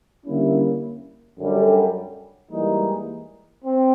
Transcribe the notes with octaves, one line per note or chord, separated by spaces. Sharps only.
D3 G3 A#3 C#4 E4
F#2 D3 G3
G#2 E3 G3 A#3 D#4
C4